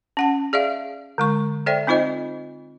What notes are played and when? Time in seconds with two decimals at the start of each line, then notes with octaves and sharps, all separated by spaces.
0.17 C#4 F#5 A5
0.53 G#4 D5 E5 F5
1.18 D3 G#3 C#6
1.66 A4 C5 D5 E5 G5
1.87 C4 D#4 F4 C5 D#5